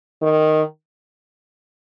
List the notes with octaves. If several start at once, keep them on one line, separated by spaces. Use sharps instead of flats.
D#3